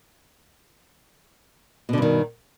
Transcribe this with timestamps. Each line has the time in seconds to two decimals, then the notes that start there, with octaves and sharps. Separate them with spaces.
1.89 B2
1.93 D3
1.98 G2
2.02 D#3